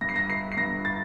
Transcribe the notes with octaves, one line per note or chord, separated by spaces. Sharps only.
G2 A#6
C7
A#6
G1 C7
C7
G2 A#6
A6